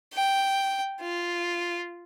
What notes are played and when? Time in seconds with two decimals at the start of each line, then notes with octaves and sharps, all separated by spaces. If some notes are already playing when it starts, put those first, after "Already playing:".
0.14 G5
1.01 F4